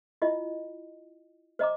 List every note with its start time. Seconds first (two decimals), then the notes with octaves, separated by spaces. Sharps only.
0.22 E4 F4 D#5
1.59 C5 D#5 A#5 D6